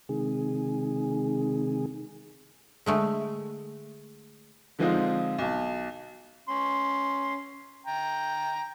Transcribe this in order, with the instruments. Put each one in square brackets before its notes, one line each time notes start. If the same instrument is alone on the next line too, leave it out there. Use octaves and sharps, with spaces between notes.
[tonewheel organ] C3 D#3 G#3 G#4
[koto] D3 G#3 A3
[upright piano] D3 F3 G#3 C4 D#4 F4
B1 A5
[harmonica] C#4 C6
G5 A#5